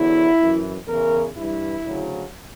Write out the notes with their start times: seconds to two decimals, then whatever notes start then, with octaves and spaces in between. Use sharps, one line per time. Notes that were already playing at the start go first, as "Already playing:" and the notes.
Already playing: E2 D3 F#3 E4
0.39 F#2 E3
0.87 E2 C#3 E3 A#4
1.37 G2 E3 E4
1.86 D2 C#3 F#3